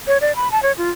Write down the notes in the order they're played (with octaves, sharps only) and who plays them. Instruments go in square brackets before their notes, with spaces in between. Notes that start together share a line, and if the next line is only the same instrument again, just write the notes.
[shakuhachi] C#5
D5
B5
A5
C#5
F4